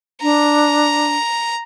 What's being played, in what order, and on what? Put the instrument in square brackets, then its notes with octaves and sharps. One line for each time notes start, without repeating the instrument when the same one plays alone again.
[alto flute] D4 [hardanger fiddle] A#5